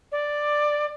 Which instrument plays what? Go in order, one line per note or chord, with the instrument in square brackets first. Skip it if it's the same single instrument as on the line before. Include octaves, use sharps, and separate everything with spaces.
[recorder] D5